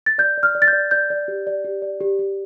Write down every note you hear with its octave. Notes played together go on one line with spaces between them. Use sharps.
A6
D5 G6
D5
F6
D5
A6
G6
D5
D5 G6
D5
G4
D5
G4
D5
G4
G4